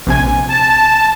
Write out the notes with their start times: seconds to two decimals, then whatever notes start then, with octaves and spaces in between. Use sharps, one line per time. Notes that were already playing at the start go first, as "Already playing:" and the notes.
0.07 A#1 C3 G#5
0.49 A5